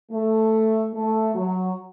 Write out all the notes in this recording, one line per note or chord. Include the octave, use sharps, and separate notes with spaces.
A3
A3
F#3